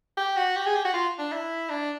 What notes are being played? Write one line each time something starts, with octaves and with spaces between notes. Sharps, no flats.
G4
F#4
G4
G#4
G4
F#4
F4
D4
E4
D4